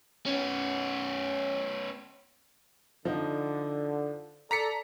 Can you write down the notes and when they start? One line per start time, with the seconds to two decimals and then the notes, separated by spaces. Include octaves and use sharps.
0.26 B3 C#4
3.05 D3 F3 D#4
4.51 A4 D5 A#5 B6 C#7